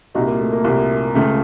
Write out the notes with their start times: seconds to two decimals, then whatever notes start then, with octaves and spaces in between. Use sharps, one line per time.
0.15 C2 A#2 D#4 F#4
0.27 A#3
0.40 A3
0.53 A#3
0.64 C2 A#2
1.15 C#2 C#3 A3